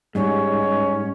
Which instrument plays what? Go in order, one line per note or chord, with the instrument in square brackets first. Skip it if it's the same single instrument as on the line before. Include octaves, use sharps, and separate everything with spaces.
[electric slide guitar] G#2 [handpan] G3 [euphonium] G#3 [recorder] C#4